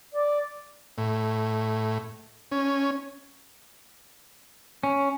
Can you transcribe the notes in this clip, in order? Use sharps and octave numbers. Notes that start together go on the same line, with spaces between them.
D5
A2
C#4
C#4